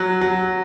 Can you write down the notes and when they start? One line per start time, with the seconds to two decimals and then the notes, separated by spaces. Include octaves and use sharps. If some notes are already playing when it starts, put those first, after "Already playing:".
Already playing: F#3 F#6
0.21 F#3